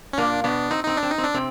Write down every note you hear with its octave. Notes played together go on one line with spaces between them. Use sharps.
C#4
A#2 A#3 D4
B2 B3 D4
C4 D#4
C4 D#4
D4
C4
D#4
C4
D4
C3 C4